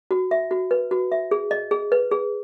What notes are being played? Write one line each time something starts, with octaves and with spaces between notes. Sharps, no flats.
F#4
E5
F#4
B4
F#4
E5
G#4
D#5
G#4
B4
G#4